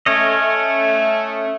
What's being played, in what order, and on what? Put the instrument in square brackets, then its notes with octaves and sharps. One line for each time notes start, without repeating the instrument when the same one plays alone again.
[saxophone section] A3 [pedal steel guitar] C#4 C#5 D#5